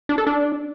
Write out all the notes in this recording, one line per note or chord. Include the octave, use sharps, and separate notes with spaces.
D4
A4
D4